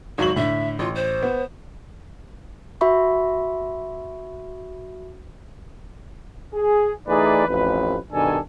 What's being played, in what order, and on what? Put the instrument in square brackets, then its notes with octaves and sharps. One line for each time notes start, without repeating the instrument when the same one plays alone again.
[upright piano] G#1 F#3 F#7 [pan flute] F#4
[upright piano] A2 D3 [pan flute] E5
[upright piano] A1 [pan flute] F4
[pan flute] C5
[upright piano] B3
[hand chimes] F#4 E5 B5 C#6
[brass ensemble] G#4
E3 A3 D#4 G#4 B4 D5
A1 F2 B4
G2 B2 D#3 D4 A4 G#5